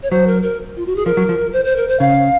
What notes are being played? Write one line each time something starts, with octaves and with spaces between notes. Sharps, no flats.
C#5
F#3 C5
A#4
A#4
F4
F#4
G#4
F3 A#4
F#3
F3
C5
C5
A#4
C5
C#3 F5